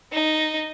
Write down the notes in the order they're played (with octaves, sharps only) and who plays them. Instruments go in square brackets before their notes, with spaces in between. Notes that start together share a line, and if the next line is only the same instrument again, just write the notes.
[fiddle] D#4